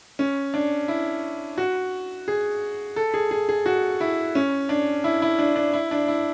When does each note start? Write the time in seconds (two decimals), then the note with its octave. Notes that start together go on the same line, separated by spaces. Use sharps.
0.19 C#4
0.54 D4
0.88 E4
1.58 F#4
2.28 G#4
2.96 A4
3.14 G#4
3.31 G#4
3.49 G#4
3.66 F#4
4.00 E4
4.35 C#4
4.69 D4
5.04 E4
5.22 E4
5.39 D4
5.56 D4
5.73 E4
5.91 D4
6.08 E4